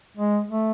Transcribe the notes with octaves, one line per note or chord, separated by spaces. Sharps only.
G#3
A3